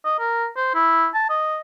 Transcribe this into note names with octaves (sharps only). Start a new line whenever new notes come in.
D#5
A#4
C5
E4
A5
D#5